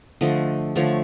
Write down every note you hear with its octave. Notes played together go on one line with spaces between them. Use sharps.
D3 F3 A3 D#5
D3 F3 A3 C#5